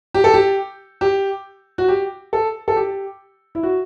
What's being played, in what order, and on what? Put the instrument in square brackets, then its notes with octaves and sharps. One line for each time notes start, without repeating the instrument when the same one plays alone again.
[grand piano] G4
A4
G4
G4
F#4
G4
A4
A4
G4
E4
F#4